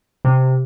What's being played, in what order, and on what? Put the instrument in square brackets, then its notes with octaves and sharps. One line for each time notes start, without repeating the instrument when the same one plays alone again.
[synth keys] C3